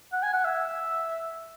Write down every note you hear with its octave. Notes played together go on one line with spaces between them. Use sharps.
F#5
G#5
F#5
E5